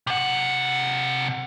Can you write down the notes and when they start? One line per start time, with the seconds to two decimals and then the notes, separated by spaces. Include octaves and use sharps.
0.07 C3 F#5